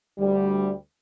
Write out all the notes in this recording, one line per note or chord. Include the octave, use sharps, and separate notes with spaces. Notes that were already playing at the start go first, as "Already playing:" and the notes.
D2 G3